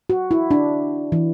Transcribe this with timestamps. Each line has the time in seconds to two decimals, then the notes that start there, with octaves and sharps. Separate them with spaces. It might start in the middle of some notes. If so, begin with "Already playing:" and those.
0.10 F#4
0.31 E4
0.51 D4
1.12 E3